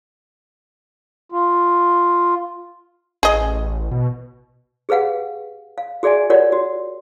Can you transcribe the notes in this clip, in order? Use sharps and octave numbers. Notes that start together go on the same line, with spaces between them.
F4
A1 G#4 D#5
B2
G4 G#4 B4 F5 F#5
F5
F#4 G#4 D5 E5 G#5
F4 G4 A#4 C#5 D5 F#5
F#4